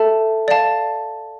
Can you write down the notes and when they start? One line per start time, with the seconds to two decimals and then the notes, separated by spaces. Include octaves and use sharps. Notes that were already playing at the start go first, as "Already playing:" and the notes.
Already playing: A4 E5 A5
0.48 D5 F5 A5